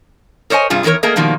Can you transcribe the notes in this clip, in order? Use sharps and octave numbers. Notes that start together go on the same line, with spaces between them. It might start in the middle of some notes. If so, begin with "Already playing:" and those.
A#4 C5 C#5 D#5 G#5
G2 C3 G3 F4 G#4
E2 D#3 E3 A#3 A#4 C#5
A3 A#3 G#4 A#4 D#5
B2 D#3 F3 G3 A#3